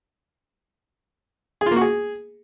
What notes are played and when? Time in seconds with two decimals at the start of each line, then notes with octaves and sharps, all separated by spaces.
1.61 G#4
1.66 F4
1.71 A#3
1.76 F#4
1.81 G#4